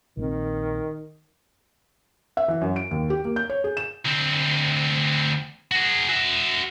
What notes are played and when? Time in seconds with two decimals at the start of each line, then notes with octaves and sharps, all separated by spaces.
0.17 A#1 D3 D#3 C4
2.37 E5
2.48 E3
2.61 F#2
2.76 D7
2.91 D#2
3.10 G4
3.25 A#3
3.36 G6
3.49 C#5
3.64 G#4
3.77 E7
4.05 D2 C4
5.72 F#4 G#4
6.09 F#4 E5